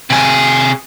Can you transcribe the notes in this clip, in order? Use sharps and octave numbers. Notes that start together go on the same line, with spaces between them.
C3 G#4